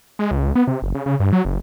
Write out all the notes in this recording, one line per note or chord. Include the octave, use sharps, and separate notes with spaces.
G#3
C#2
B3
C3
F#1
C#3
C#3
G2
F#3
F#1